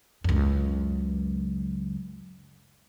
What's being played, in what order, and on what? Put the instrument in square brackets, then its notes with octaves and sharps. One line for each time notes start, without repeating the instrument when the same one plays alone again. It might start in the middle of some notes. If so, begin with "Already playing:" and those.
[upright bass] C#2 F#2